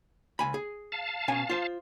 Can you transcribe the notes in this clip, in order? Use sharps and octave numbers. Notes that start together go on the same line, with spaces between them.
C#2 G#5 B5
G#4
F5 A5
B2 C#4 G#5
F4 C5